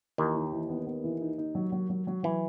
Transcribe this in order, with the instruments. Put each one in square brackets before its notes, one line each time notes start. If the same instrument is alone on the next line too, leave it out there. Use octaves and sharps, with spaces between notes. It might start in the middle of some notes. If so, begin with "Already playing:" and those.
[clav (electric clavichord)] D#2 D#3 [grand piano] E3
[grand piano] D#4
E3
B3
B3
E3
D#4
D#4
F#3
F#3
F#3
F#3
[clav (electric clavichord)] E3 [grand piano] F#3